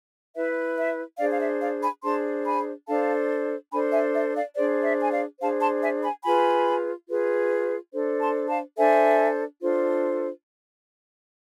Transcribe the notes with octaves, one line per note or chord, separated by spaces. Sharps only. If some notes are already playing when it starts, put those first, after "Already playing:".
E4 B4 E5
E5
D4 G#4 C5 D5 F5
F5
E5
D5 F5
G#5 B5
D4 G#4 C5 A5 C6
G#5 B5
D4 A4 C5 F5 A5
D4 A4 C5 G#5 B5
E5 G#5
E5
D5 F5
D4 G#4 C5 D5
E5
G#5
D5 F5
D4 G#4 C5 F5 A5
A5 C6
E5 G#5
G#5 B5
F4 G#4 B4 G#5 B5
F4 G#4 B4
D4 A4 C5
A5 C6
F5 A5
D4 A4 C5 E5 G#5
D4 F4 A4 C5